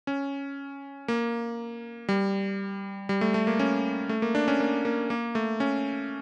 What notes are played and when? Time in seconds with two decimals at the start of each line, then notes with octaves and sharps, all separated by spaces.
0.07 C#4
1.08 A#3
2.09 G3
3.09 G3
3.21 A3
3.34 A3
3.47 A#3
3.59 C#4
4.09 A3
4.22 A#3
4.35 D4
4.48 C#4
4.60 A#3
4.85 A#3
5.10 A#3
5.35 A3
5.60 C#4